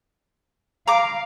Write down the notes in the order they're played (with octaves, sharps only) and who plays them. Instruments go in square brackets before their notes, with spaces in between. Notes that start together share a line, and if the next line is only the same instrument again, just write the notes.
[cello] F5 [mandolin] A#5 D6